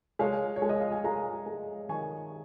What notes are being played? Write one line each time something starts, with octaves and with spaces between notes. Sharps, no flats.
G#3 C#5 F5
C#5
G#3
D#5
F5
G#5
G#3 F5 A#5
G#3
D#3 G#5 C#6